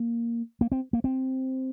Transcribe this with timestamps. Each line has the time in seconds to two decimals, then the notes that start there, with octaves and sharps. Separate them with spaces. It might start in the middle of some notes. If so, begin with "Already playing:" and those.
Already playing: A#3
0.61 A#3
0.72 C4
0.93 A#3
1.04 C4